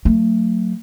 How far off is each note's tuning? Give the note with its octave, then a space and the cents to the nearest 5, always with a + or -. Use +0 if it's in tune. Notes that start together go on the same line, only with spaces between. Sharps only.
F#3 -15 A3 +30